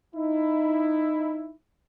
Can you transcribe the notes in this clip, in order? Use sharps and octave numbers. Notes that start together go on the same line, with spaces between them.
D#4 E4